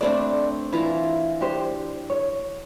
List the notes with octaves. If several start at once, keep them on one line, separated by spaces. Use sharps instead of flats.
A3 C4 D4 B4 D5
E3 E4 F4 A#5
D4 G4 C5
C#5